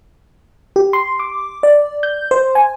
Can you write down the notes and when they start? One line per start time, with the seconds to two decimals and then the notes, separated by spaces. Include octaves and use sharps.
0.76 G4
0.93 C6
1.20 D6
1.63 D5
2.03 G6
2.31 C5
2.55 G#5